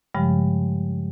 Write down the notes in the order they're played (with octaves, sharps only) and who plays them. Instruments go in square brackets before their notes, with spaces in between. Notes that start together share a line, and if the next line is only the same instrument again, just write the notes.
[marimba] G2 C#3 F3 G3 G#3